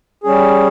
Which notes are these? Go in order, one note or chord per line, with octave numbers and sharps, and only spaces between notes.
G3 C#4 G#4